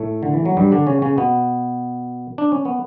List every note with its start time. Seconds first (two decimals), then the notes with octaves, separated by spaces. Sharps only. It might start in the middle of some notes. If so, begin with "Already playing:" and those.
Already playing: A2 A3
0.23 D3
0.34 E3
0.45 F#3
0.57 G2 G3
0.72 D3 D4
0.87 C#3 C#4
1.02 C#3 C#4
1.18 B2 B3
2.38 D4
2.52 C#4
2.65 B3